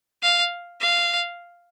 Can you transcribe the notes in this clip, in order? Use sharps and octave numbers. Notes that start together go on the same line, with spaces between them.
F5
F5